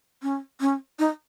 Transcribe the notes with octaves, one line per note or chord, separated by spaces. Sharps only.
C#4
C#4
D#4